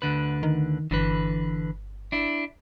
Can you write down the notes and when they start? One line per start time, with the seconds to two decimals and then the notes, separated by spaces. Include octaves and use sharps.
0.02 D2 D3 B4
0.43 D#3
0.91 G1 D3 E3 B4
2.12 D4 E4